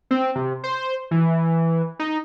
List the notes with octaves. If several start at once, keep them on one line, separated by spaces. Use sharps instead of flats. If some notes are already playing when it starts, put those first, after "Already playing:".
C4
C3
C5
E3
D#4